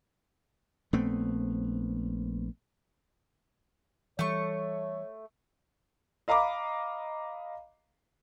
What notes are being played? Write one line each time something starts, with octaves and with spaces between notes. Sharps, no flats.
A#1 A3 B3 C4
E3 G3 A3 C#5 C#6
D#5 F5 A#5 B5 D6